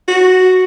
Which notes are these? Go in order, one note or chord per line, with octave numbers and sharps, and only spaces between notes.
F#4